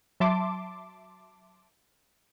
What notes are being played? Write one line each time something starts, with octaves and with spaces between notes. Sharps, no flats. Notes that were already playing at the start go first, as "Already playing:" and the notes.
F#3 E5 A5 C6 D6